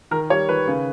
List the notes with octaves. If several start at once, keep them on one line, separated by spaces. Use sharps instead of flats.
D#3 A#4
G3 C#5
D#3 B4
C#3